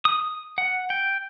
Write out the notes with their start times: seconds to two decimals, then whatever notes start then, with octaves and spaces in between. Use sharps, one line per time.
0.05 D#6
0.58 F#5
0.90 G5